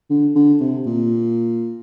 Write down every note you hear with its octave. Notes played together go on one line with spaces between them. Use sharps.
D3
D3
C3
A#2